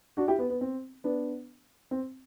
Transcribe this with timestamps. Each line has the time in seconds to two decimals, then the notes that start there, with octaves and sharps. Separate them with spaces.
0.17 D4 F#4
0.28 E4 G4
0.39 B3
0.50 B3
0.61 C4
1.04 B3 D4
1.91 C4